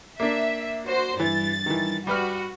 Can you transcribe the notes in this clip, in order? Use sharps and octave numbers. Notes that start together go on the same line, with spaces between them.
A#3 D4 E5
F#4 C5
G2 E3 A6
D#3 E3
G3 F#4 B4 F6